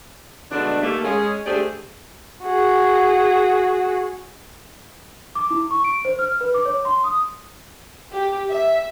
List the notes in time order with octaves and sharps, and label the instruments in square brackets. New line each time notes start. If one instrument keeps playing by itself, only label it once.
[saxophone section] B2 D3 G#3 A3 D4
D#2 A3 A#3
G#3 C#4 G#4
D3 A3 G4 G#4 C5 D5
[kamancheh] F#4 G#4
[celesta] D6
E4
C#6
D7
C5
F6
B4
D6
C#5
C6
D#6
[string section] G4
E5